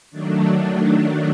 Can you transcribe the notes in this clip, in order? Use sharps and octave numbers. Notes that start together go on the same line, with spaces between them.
D#3 F#3 A3 D4